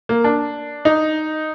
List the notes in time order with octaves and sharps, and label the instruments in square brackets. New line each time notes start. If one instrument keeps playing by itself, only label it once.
[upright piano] A#3
D4
D#4